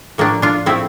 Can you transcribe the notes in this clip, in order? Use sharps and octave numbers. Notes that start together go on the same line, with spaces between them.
A2 F3 A3 A#3 D4
D4 F4
A2 F3 A3 C4 E4